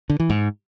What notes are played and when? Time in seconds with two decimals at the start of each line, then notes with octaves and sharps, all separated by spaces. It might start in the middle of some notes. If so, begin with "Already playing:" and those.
0.10 D3
0.20 E3
0.30 G#2